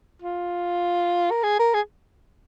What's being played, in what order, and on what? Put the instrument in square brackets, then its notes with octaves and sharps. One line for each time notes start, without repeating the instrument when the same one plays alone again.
[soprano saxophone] F4
A#4
G#4
A#4
G#4